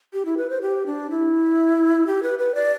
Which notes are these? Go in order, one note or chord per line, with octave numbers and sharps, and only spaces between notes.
G4
E4
B4
C5
G4
D4
E4
G4
B4
B4
D5